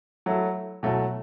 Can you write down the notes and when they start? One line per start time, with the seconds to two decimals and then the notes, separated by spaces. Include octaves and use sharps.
0.26 F#3 A3 E4 A4
0.83 B2 F#3 A3 E4